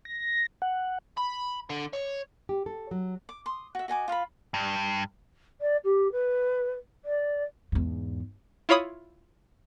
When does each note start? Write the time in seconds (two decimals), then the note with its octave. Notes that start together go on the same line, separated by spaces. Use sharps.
0.05 A#6
0.62 F#5
1.18 B5
1.70 D3
1.93 C#5
2.49 G4
2.66 A4
2.91 F#3
3.29 D6
3.46 C6 D#6
3.75 F#4 E5
3.88 F#4 D#5 G#5 D6
4.08 F4 F5 A#5 B5
4.54 G2
5.61 D5
5.84 G4
6.12 B4
7.05 D5
7.72 E2 G#2
8.69 E4 F4 C#5 B5 D#6